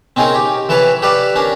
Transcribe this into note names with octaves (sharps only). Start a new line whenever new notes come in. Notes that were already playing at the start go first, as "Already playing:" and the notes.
C4 C#4 D#4 G#4 A#4
G4
E3 A4 B4 C#5 A5
G4 A4 B4 D5 F5
C#4 D4 A#4